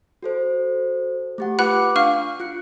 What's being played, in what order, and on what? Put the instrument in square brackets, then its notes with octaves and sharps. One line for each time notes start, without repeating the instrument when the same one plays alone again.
[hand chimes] F#4 A4 C5
A3 G4 F#5
[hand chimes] F4 B4 D6 [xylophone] F#5 B5 F#6
[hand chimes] D4 [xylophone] F5 C#6 F6
[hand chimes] F4 F#6 C#7